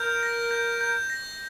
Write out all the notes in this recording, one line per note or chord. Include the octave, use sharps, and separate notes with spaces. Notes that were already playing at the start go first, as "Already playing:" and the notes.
Already playing: A#4 G6
A#6
G6
G6
A#6